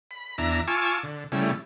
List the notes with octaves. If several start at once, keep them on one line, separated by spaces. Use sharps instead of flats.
B5
E2 D4 E5 A#5
F4 G#5 A5 C#6 D6 E6
D3
C#3 G3 A3 E4